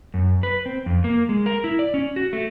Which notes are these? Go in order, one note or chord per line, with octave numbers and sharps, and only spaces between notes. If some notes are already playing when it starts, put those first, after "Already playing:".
F#2
B4
C4
F2
A#3
G#3
A#4
E4
D5
C#4
F#4
A3